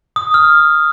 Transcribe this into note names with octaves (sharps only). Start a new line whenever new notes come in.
D#6
F6